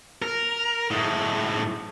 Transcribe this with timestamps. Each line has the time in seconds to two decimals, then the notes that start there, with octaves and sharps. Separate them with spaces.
0.22 A#4
0.91 A2 G#3